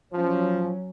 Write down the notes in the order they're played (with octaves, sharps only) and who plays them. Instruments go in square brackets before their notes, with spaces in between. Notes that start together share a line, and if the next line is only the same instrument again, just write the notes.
[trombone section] F3 [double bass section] F#3 C#4